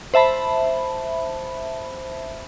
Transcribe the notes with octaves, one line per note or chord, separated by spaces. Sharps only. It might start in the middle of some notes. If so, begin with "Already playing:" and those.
C5 E5 A5 B5